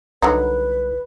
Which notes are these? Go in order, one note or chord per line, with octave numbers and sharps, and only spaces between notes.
C2 D3 F#3 D#4 B4